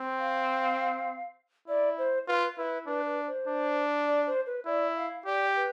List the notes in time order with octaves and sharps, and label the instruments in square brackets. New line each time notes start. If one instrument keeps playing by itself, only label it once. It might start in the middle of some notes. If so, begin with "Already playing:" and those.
Already playing: [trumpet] C4
[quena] F5
[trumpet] E4 [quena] D5
[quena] C5
[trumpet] F4 [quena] B4
[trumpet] E4 [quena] B4
[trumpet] D4 [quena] B4
[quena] B4
C5
[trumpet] D4
[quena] D5
C5
B4
[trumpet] E4 [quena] D5
[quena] F5
[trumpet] G4 [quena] D5
[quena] B4